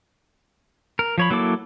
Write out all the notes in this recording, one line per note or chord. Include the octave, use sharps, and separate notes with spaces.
A#4
F3 C#5 B5
F#3 A#3 E4 A4 D6